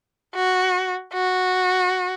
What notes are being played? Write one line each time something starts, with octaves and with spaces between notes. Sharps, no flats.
F#4
F#4